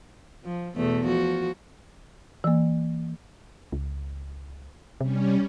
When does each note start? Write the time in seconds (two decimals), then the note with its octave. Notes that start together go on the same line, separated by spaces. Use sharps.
0.45 F3
0.76 E2 B2 A3
1.06 F3 F#4
2.44 E3 A#3
3.72 C#2
5.01 C3 G3 C#4